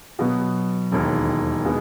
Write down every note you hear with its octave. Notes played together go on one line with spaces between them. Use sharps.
B2 F#3 B3
E1 D#2 D#3
B2 G#3 B3